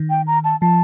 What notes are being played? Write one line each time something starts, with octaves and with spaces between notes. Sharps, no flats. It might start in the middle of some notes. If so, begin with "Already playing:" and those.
Already playing: D#3
G5
A#5
A5
F3 A5